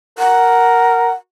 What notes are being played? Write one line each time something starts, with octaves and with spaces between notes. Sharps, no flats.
A#4 F#5